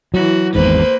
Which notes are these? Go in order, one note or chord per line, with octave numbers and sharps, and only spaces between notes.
E3 F#3 F#4
G#1 E2 G#2 A#3 B4 C5